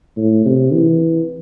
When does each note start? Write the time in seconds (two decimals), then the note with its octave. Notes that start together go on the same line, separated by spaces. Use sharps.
0.17 A2
0.45 C3
0.73 E3